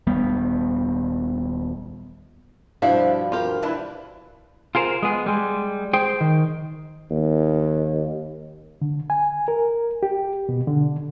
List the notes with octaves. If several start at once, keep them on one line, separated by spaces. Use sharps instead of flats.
D#1 G3 B3
G2 B2 F3 D4 E4 F5 F#5
F5
F4 G4 A#4 B5
E3 D4 E4
F4 G#4 A#4 C5
G#3 B3 G#4
G3 G#3
G#4 C5 G5
D#3
D#2
D3
G#5
A#4
G4
B2
D3